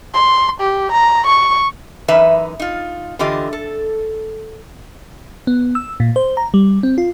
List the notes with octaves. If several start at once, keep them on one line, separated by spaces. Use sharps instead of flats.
C6
G4
A#5
C#6
F#2 E3 D#4 B4 E5
D#4 F4
D3 E3 F4 G4 D#5
A4
B3
E6
A#2
C5
A#5
G3
C4
F4